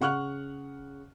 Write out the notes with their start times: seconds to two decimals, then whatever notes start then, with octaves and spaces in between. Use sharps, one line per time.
0.01 C#3 F#5 C#6 F6 F#6